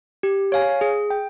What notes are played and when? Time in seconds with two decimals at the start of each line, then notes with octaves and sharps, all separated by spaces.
0.23 G4
0.52 C#5 F5 G#5
0.81 G#4
1.10 G5